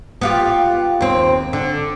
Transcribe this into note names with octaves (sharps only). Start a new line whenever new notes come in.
B3 F4 G4
D#2 C4
D3